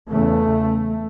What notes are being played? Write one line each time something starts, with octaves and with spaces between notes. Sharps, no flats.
E2 C#3 A3